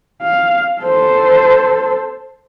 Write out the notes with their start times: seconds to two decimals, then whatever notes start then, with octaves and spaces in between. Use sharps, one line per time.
0.22 F5
0.82 A4 C5